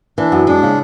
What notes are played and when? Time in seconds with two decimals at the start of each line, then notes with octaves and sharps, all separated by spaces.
0.18 E3 D4
0.32 F#2
0.47 G#3 D4
0.63 C#3